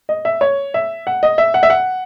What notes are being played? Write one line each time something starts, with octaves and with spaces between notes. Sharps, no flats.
D#5
E5
C#5
E5
F#5
D#5
E5
F#5
E5
F#5